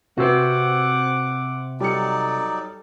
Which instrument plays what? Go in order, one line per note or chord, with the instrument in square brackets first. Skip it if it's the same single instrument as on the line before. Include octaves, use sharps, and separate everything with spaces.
[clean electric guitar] C3 C4 [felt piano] F#4 B4 [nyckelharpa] F#5 D6
[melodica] F#3 D#4 D5 [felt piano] G3 C#7 [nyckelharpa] A4